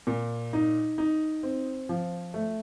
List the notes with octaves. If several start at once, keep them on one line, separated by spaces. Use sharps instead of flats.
A#2
D#4
D#4
C4
F3
A3